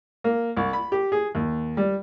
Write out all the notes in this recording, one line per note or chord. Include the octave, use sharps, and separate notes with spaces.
A#3
C2
B5
G4
G#4
D#2
G3